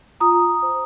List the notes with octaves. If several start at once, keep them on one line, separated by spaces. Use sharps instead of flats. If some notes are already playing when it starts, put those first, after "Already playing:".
F4 A#5 D#6
C5